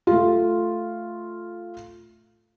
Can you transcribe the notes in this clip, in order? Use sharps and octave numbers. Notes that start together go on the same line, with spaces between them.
A3 F4